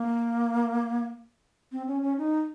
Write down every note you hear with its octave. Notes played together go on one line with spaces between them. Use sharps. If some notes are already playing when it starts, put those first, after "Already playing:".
Already playing: A#3
C4
C#4
C#4
D#4